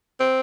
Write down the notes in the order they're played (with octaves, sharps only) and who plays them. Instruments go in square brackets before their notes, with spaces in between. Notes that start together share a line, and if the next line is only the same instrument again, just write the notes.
[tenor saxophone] C4